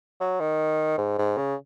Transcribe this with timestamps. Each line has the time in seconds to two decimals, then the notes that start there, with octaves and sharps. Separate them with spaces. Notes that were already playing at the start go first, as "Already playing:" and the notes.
0.21 F#3
0.40 D#3
0.98 G#2
1.18 G#2
1.37 C#3